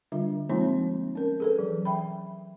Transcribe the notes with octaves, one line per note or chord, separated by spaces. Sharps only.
D3 G3 D4 F4 E5
F3 G#3 A#3 C4 D#4 F4
C#4 A#4
G#4 A4 B4
E3 F#3
E5 G5 B5